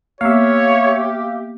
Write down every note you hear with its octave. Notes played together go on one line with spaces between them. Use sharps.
A#3 B3 G4 C#5 E5 F5